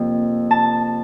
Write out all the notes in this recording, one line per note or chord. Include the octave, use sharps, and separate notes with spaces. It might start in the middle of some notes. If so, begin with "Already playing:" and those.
Already playing: F2 C3 F3 A#3
A5